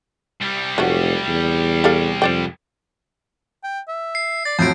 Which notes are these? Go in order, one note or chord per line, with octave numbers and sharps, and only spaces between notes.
C2 G3
F1 F#3 A3 F#4
E2
G4 A4 F5
F2 C5 D5 G5
G5
E5
C7
D5 A6
F2 A2 F#3 E4 G6 C7 D7